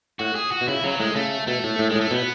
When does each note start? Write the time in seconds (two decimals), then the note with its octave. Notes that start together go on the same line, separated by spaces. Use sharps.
0.19 A2 F#4
0.35 G#4
0.52 F#4
0.61 B2
0.68 C#3 E4
0.84 C#3 F#3
1.00 A2 G#3
1.15 C#3 A3
1.47 B2 A3
1.64 A2
1.79 A2
1.89 G#3
1.95 A2
2.01 A3
2.11 B2 B3